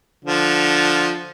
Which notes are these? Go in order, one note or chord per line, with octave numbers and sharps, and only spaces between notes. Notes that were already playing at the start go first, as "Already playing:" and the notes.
D3 F3